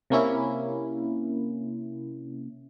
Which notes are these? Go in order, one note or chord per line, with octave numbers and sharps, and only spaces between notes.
C3 A#3 C#4 E4